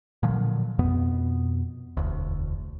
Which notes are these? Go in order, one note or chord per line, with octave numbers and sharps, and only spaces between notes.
A#2 D3 F3 F#3
F2 B2 B3
E1 D2